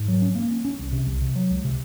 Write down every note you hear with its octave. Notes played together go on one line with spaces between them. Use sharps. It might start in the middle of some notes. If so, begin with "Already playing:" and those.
Already playing: G#2
F#3
C#4
A#3
C#4
C#4
C2
C3
C2
C3
F#3
C#2
C3